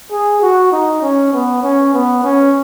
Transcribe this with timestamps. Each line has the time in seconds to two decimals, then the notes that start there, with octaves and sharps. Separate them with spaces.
0.11 G#4
0.42 F#4
0.72 D#4
1.02 C#4
1.33 B3
1.63 C#4
1.94 B3
2.24 C#4